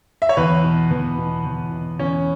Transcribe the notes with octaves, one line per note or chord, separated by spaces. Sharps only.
E5
C#5
E2 B4
B2
E2 B3
B2
E2
B2
E2 C#4